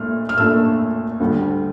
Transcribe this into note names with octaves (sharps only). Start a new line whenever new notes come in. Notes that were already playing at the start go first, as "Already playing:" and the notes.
Already playing: A#2 A3 D4 F6
F6
A#2 A3 D4 E6
D2 D3 G3